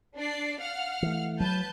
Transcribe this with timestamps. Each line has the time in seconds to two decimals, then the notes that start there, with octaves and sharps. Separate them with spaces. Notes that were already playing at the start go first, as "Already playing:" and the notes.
0.16 D4 D5 C7
0.60 F5 F#5 F6
1.02 E3 A3
1.40 F#3 B4 A5 G6